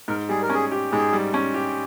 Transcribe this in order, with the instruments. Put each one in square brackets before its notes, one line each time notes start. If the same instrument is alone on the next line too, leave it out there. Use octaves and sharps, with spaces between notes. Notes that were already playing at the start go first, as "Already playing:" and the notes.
[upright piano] G#2 [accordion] A#4
[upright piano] G3 [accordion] G#4
[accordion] A#4
[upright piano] C#4 [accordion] G#4
[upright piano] G4
[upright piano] G#2 [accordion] G#4
[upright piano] G3
C#4
G4